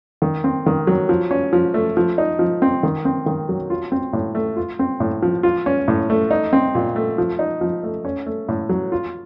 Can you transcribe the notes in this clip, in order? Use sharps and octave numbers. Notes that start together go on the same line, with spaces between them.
D#3
C4
D#3
F#3
F3
C#4
F3
A3
F3
D#4
F3
C4
D#3
C4
D#3
F#3
F4
C4
A2
A3
F4
C4
A2
F3
F4
C#4
A2
A3
D#4
C4
A#2
A3
F3
D#4
F3
A3
C#4
A3
A2
F#3
F4